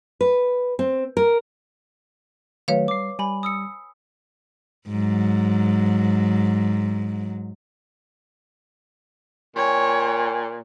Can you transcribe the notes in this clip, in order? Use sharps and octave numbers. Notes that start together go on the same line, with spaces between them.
B4
C4
A#4
D#3 F#3 A3 B4 C#5 F5
G3 D6 C7
G3 G#5 B5
D#6 E6 C#7
G#2 F#3
A#2 C#5 G5 G#5